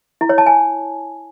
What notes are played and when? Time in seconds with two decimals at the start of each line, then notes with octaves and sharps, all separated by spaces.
0.21 E4
0.29 C#5
0.38 A5
0.46 G#5